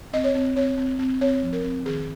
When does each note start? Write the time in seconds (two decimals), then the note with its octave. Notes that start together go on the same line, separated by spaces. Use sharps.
0.13 C4 D#5
0.24 C#5
0.35 C4
0.56 C4 C#5
0.78 C4
0.99 C4
1.21 C4 C#5
1.42 F3
1.53 A#4
1.64 C4
1.85 D#3 G#4